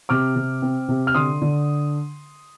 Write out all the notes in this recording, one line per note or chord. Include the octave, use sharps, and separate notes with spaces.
C3 D6 F6
C3
C4
C3
F6
D3 C6 D#6
D3